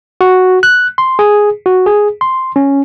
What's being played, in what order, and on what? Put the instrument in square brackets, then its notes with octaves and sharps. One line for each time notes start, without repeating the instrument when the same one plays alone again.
[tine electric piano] F#4
F#6
C6
G#4
F#4
G#4
C6
C#4